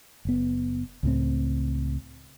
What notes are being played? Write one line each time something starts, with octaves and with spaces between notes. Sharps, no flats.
F#1 B3
C#2 A2 C4